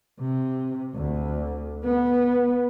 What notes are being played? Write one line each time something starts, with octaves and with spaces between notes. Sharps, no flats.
C3
D2
B3